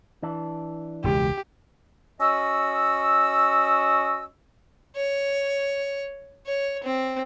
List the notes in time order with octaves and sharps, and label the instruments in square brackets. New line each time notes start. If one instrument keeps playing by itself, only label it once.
[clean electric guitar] E3 D4
[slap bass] E1 C#2 G#3 [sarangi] G4
[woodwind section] C#4 F#4 D#5 E6
[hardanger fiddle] C#5
C#5
C4